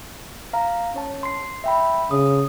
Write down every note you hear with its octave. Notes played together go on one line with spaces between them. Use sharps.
F5 A#5
C#4 C#5 A5
C6 C7
E5 G5 B5
C#3 D#6